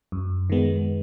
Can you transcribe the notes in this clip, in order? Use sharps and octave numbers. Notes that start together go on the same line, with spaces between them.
F#2
D#3 G#3 B3